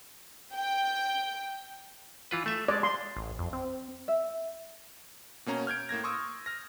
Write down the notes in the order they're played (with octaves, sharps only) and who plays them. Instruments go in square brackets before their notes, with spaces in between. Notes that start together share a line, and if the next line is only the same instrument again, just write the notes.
[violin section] G5
[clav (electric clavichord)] E3 F4 B4
A3 E5
[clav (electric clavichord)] G#3 [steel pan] D5
[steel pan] C6
[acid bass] A1
F2
C4
[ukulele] E5
[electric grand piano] B2 A#3 C#4 A#5
F6 G6 G#6 D7
A2 A#3 G#6 A#6
C6 C#6 D#6 E6
F6 A#6